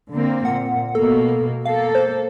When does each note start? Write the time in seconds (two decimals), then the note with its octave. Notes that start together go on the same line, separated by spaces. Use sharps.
0.12 D3 A#3 C4
0.45 A#2 F#5
0.95 B2 A#3 A4
1.65 A#3 A4 F5
1.95 C5